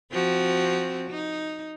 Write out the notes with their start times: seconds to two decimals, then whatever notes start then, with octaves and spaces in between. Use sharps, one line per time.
0.12 F3 C4 F#4
1.11 D#4